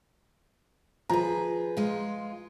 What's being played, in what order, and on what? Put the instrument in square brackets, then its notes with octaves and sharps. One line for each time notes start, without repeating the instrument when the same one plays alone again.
[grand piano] F3 A#5 [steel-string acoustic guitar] G#4 B4
[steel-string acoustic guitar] G#3 F4